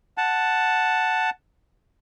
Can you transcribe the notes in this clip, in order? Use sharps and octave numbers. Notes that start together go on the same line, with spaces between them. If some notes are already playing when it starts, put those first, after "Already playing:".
F#5 A5